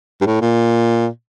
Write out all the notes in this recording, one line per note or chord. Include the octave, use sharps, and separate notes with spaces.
G2
A2
A#2